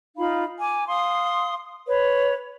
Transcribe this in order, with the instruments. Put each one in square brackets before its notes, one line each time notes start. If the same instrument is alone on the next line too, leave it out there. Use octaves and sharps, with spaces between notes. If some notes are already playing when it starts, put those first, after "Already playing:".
[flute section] D#4 F4 F5 B5
G#5 D6
F5 C6 D#6
B4 C#5